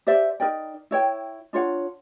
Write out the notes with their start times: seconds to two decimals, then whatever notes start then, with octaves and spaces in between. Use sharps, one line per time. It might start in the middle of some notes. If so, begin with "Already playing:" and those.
0.07 G4 C5 D5 E5
0.40 D#4 A#4 D5 G5
0.91 E4 C#5 G5
1.53 D4 F4 C#5 F#5